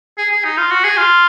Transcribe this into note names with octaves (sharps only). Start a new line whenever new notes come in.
G#4
G#4
D#4
F4
F#4
G#4
F4